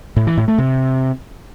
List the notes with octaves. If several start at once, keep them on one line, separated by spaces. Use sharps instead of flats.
A2
E3
A2
A3
C3